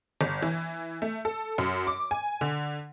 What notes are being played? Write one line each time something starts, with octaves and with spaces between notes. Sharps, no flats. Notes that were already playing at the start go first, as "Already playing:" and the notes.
G1
E3
A3
A4
F#2
D6
G#5
D3